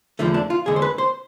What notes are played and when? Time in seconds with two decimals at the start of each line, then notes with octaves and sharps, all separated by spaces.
0.19 E2 D3 F3 A3
0.34 D4
0.50 F4
0.66 E2 D3 G#3 G#4
0.76 C5
0.82 B4
0.98 C5